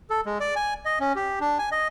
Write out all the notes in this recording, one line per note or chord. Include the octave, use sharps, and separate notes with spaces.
A4
G#3
D5
G#5
D#5
C#4
G4
D4
G#5
D#5